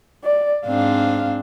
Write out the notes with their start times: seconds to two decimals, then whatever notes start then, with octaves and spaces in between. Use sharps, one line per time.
0.24 D5
0.66 G#2 C4 D4 F5